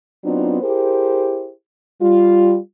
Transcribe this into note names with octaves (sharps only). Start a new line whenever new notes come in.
F#3 B3 C4 D4 D#4 F4
E4 G4 G#4 A#4 C5
G3 F4